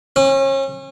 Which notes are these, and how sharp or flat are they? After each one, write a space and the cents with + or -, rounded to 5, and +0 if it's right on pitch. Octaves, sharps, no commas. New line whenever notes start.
C#4 -35